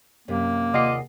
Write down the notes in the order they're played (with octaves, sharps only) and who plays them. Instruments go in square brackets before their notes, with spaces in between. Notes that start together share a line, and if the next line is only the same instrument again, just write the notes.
[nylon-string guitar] F#2 C3 [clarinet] A#3
[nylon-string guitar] D#2 G#4 [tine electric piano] C3 F#5 C7 [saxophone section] F4 D5 D#5